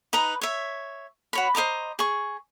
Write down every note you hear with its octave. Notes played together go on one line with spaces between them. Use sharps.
D#4 B4 A#5 D#6
C#5 E5
F#4 C#5 B5
C5 D#5 A#5 D6
G#4 C#6